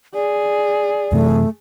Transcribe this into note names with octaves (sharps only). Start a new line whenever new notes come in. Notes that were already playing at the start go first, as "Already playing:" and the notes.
G#4 D5
F#2 C3 E3 A3